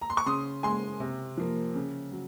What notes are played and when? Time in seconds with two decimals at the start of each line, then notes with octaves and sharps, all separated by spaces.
0.01 A#5
0.10 C6
0.17 C#6
0.26 C#3 C6 D#6
0.63 G#3 G#5 C6
1.00 C3
1.37 F3 A#3
1.75 C#3
2.12 F#3